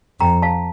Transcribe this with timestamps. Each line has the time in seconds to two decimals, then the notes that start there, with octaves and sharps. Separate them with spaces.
0.20 F2 G5 A#5
0.42 F5 A5